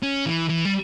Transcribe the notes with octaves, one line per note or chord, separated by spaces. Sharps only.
C#4
E3
E3
G3